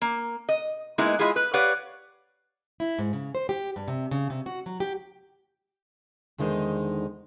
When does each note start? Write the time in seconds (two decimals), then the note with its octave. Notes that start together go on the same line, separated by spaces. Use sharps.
0.02 A#3
0.49 D#5
0.98 G#3 A#3 B3 D#4 E4
1.19 G#3 E4 F4 G#4 F5
1.36 B4
1.54 G4 B4 C#5 D5 F5 F#5
2.80 E4
2.99 G#2
3.13 C#3
3.35 C5
3.49 G4
3.76 G2
3.88 C3
4.11 C#3
4.30 C3
4.46 F#4
4.66 F#3
4.80 G4
6.38 E2 D3 D#3 G#3 D#4 C5